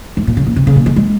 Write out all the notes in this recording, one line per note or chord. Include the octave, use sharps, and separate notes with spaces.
G#2
A#2
C#3
A#2
C3
C#3
A#2
G#3
G#3